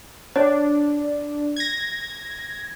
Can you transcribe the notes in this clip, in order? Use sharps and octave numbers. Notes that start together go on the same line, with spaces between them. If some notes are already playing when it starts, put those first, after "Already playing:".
D4 C#5
G#6 A#6